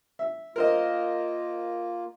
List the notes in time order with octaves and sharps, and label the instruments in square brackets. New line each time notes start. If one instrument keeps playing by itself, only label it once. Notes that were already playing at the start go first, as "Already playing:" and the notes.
[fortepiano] E5
[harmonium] A#3 F4 [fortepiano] A#4 C5 D#5